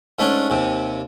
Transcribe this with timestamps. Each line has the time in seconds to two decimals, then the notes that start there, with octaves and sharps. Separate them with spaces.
0.19 G#2 A3 C#4 D4
0.50 D#2 C3